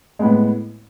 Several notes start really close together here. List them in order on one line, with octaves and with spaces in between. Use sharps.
G#3 B3 A2